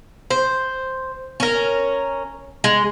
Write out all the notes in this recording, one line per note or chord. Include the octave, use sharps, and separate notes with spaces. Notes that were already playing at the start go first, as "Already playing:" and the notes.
C5
C#4 A#4
G#3